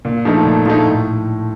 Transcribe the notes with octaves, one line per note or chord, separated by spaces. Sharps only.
A#2
F3 A3 D#4
A#2
F3 A3 D#4
A2